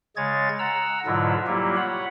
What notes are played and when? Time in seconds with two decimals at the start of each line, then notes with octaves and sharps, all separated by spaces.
0.16 C#3 G#3 G#4 C#5 G#6 A6
0.59 F#5 A#5 E6
1.06 G#2 B2 D3 F#3 E4 F4
1.47 F#3 G3 A#3 E4 F4 G4
1.76 C#5 F#5 B5